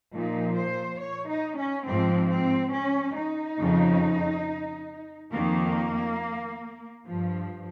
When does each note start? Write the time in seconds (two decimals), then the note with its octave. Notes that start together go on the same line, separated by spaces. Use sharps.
0.13 A#2 F3 D#4
0.56 C5
0.99 C#5
1.28 D#4
1.57 C#4
1.85 G#2 F3 C4
2.29 C4
2.73 C#4
3.16 D#4
3.59 F2 C#3 F3
5.32 F2 D#3 A#3
7.05 G2 F3